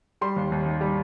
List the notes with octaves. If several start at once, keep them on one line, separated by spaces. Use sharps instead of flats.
G3 C6
D#2
D#2
D#3
G3